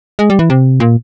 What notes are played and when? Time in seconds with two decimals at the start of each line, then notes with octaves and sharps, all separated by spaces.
0.19 G#3
0.30 G3
0.39 E3
0.50 C3
0.80 A#2